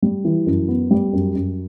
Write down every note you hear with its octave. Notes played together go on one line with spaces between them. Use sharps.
G3
E3
F#2
B3
G3
F#2
F#2